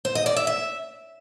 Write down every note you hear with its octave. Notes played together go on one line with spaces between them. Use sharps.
C5
D#5
D5
E5
E5